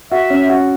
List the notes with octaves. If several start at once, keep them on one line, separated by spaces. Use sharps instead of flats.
F#4 E5
C#4
F#4